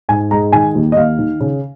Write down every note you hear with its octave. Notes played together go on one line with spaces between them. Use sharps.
G#2 G#5
G#3 A#5
D#3 G#5
D#2
D#5
D#2 F5
D#3
C#3